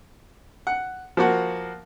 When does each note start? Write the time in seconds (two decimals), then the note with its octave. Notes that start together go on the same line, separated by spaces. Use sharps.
0.67 F#5
1.17 F3 A#3 F#4